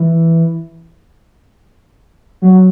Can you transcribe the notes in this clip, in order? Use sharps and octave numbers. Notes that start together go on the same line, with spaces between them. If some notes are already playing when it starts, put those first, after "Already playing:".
Already playing: E3
F#3